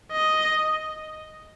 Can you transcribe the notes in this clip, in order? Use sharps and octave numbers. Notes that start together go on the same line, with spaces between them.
D#5